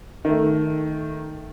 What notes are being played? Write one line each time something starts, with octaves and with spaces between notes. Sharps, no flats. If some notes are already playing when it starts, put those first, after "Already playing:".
D#3 A3